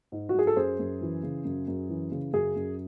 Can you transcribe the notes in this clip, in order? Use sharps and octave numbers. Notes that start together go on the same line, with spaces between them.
G#2
F#4
F#3 G#4
A4
F#2 G#4 C5
F#2
E3
C#3
F#2
F#2
E3
C#3
F#2 G#4
F#2